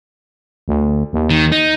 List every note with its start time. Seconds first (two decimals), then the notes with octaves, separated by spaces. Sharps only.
0.68 D2
1.13 D#2
1.30 D#3
1.52 D#4